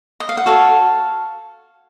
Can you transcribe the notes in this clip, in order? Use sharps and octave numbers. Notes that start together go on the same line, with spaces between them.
D#5
F5
F#5
F#4 A4 C#5 F5 A5